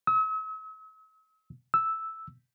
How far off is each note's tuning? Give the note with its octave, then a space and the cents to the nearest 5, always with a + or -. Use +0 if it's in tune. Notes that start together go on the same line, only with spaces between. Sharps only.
E6 -45
E6 -5